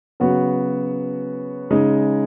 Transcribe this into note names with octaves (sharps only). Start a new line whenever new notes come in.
C#3 F#3 B3 F#4
C#3 G#3 D#4